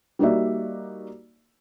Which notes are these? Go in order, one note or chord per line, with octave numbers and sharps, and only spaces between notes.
G3 A#3 D#4 F#4 D5 E5